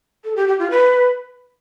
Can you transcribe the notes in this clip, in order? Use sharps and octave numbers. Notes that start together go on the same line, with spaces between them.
A4
G4
G4
F4
B4